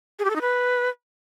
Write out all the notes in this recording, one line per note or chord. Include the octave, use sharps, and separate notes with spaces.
G#4
G4
A4
D#4
B4